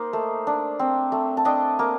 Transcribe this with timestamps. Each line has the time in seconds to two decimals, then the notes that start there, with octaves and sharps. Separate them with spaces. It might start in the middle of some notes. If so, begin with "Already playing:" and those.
Already playing: A#3 D#4 C5 D#5
0.13 A3
0.47 D4
0.79 C4
1.12 A3
1.37 A5
1.45 D4 D#5 G5
1.79 A#3